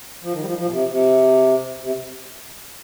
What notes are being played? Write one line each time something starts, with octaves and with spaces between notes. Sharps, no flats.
F3
D#3
G3
F3
F3
A#2
C3
C3
C3